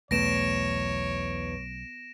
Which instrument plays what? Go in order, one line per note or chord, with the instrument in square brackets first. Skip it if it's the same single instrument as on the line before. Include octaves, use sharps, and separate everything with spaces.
[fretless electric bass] B1 A3 B3 [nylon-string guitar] E2 [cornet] C#5 [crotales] A#6 D7 E7